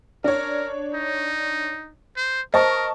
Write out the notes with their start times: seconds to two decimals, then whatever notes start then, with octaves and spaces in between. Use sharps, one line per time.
0.24 D4 A#4 C#5
0.94 D#4
2.16 C5
2.54 A#4 C5 D#5 A5 C#6